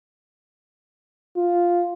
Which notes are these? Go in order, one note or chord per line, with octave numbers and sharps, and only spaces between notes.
F4